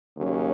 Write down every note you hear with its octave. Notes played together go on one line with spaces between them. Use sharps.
D#2 C#3 F#3 C#4